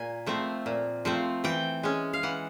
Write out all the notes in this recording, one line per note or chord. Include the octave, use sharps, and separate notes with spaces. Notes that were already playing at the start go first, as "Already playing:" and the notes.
Already playing: A#2 G#5
F3 A3 C4
A#2
F3 A3 C4
E3 G5
G#3 C#4
F5
E3 F#5